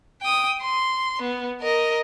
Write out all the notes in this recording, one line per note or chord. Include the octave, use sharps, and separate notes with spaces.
G5 D#6
C6
B3
A#4 D#5